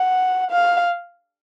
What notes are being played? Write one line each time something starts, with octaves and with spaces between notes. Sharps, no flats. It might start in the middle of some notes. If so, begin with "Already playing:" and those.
Already playing: F#5
F5